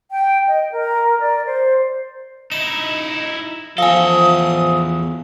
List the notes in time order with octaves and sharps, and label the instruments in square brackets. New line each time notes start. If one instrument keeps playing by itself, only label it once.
[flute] G5
D#5
A#4
D5
C5
[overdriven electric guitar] D#4 E4 [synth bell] E7
[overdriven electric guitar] E2 A4 [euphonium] F3 [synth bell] F5 G#5 [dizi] D#6